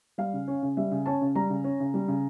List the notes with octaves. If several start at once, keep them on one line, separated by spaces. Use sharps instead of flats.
G3 F5
C#3
C#4
C#3
G3 E5
C#3
C#4 A5
C#3
G3 A#5
C#3
C#4
C#3
G3
C#3